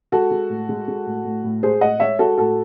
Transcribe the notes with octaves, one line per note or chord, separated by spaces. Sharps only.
G#3 F#4 A4
G#3
A2
G#3
G#3
A2
A2
A2
G#3 G#4 C5
A2 D#5 F#5
G#3 C#5 E5
G#3 F#4 A4
A2 F#4 A4